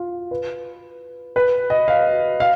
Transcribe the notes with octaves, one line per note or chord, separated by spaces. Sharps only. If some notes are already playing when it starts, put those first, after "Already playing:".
Already playing: F4
B4
B4
D#5
F5
F5